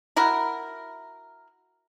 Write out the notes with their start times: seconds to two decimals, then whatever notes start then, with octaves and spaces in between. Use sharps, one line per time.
0.16 E4 F#4 A#4